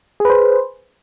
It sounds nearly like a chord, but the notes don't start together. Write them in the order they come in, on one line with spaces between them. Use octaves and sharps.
G#4 B4 C5